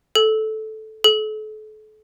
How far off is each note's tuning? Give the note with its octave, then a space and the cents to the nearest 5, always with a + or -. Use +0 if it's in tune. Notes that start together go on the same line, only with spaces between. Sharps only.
A4 -10
A4 -40